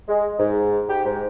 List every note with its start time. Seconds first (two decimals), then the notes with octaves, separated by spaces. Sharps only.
0.08 G#3
0.39 G#2
0.89 G4
1.05 G#2